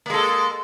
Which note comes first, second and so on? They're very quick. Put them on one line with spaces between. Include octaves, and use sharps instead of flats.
A#3 G#3 A4